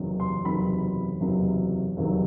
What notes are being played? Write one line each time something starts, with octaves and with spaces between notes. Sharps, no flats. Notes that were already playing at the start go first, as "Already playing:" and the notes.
Already playing: F#1 E2 C3 D#3 F#3
C6
F#1 E2 C3 D#3 F#3 B5
F#1 E2 C3 D#3 F#3
F#1 E2 C3 D#3 F#3